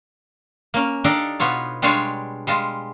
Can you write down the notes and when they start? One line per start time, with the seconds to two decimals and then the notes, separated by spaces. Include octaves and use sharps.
0.74 A#3 C#4
1.04 D4 D#4 G4 A4 D5 F5
1.40 B2 B3 F4 C#5
1.82 G3 G#3 D4 F4 C#5 F5
2.47 G3 G#3 F4